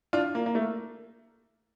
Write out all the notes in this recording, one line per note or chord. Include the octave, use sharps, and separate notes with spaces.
D4 F4
A#3
A#3
A3